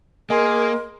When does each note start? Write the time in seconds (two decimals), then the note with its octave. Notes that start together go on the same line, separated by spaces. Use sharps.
0.30 A#3 G#4 A#4 D#5 G#5 C6